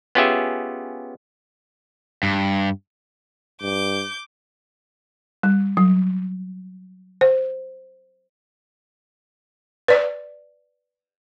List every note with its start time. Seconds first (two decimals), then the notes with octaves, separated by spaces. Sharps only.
0.15 B3 C#4 F4 G4 G#4 E5
2.23 G2
3.62 G2 D6 G6
5.43 G3
5.77 F#3
7.21 C5
9.88 B4 D5